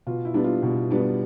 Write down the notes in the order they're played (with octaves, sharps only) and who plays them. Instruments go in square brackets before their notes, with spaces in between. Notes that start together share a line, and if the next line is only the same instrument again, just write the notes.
[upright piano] B2 F4
E4
G3 B3 D4
F4
B2
G3 B3 D4